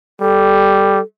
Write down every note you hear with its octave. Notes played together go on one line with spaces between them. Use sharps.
G3 A4